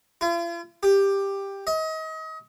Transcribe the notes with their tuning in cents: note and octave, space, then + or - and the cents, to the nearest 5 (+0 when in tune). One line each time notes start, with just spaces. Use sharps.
F4 -45
G4 +10
D#5 +35